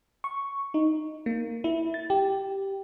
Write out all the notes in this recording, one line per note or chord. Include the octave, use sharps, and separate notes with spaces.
C#6
D#4
A#3
E4
A6
G4